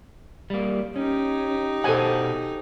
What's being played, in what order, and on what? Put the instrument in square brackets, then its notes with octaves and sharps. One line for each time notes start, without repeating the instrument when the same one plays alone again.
[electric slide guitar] G3 A#3
[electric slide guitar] C#4 [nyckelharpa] D#4 G4
[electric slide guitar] B2 C5 F#5 [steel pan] A4 G#5